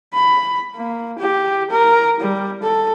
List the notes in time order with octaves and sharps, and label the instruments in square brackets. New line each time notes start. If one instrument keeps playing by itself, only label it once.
[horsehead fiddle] B5
A#3
G4
A#4
G3
A4